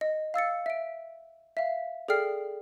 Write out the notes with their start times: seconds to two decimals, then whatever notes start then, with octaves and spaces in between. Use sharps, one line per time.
0.01 D#5
0.34 F5 E6 A6 C#7
0.66 E5 D7
1.57 E5 F5
2.08 G#4 A4 D5 G5 F6 C7